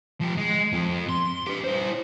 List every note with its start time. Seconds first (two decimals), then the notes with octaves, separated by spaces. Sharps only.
0.21 F3 G4
0.37 G#3
0.73 F2
1.09 C6
1.47 G4 B4
1.64 E4 C5